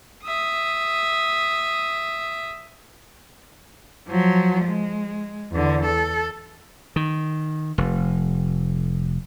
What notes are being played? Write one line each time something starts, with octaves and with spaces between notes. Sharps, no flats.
E5 D#6
F3 F#3
G#3
E2 D3
A4
D#3
F1